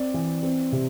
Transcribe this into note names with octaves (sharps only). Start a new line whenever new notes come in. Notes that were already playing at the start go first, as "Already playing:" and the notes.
Already playing: C4 D5
E3
C4
C3